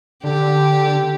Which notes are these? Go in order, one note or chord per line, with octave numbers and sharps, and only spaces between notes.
D3 G4